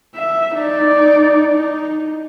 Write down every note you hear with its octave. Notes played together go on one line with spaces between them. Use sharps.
E5
D#4 D5
D#4